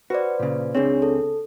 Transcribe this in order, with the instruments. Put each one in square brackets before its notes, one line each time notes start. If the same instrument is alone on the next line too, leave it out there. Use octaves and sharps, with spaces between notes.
[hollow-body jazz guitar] F#4 [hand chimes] B4 C5 D5
[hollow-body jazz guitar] A#2 C#3
[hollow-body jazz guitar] C#2 C4 [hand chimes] D4 G#4 C#5
[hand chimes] A4